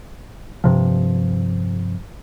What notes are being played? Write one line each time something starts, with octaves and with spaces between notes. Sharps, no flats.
G2 C3 F3